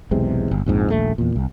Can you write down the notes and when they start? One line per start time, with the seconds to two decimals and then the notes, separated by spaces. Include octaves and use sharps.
0.11 B1 E2 C3 G#3
0.51 G1
0.66 A#1 F2 G#2
0.90 D#1 A#1 A3
1.18 E2 A#2
1.36 C2